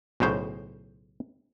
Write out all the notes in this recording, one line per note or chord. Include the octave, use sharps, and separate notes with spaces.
B1 A2 C#3 C5